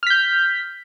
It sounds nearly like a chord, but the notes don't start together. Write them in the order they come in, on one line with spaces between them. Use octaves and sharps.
F6 B6 G6